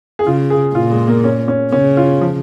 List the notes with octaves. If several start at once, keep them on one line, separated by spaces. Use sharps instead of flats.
G#4
C#3 F4
G#4
A#2 F4
G#3
A#3
C#4
C#4
C#3 C#4
F4
F3